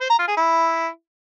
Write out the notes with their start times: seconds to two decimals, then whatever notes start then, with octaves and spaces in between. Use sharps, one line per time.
0.01 C5
0.10 A#5
0.19 F4
0.28 G#4
0.37 E4